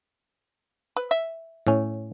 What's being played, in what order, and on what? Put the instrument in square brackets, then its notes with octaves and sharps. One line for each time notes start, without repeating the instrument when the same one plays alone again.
[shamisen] B4
E5
[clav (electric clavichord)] A2 C#4